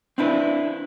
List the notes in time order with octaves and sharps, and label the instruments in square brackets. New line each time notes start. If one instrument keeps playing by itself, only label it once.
[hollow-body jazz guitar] C4 D4 E4 B4